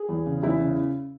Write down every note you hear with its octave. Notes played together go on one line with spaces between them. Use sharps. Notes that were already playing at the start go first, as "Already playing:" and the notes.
Already playing: G#4
E2
C#3
E2 E4
C#3